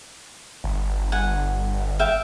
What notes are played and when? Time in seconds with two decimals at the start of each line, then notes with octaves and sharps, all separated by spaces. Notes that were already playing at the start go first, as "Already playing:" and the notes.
0.64 G1
1.12 F#5 G#5
1.99 E5 F5 G5